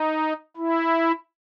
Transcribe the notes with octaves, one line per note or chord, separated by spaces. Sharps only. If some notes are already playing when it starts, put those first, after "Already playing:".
Already playing: D#4
E4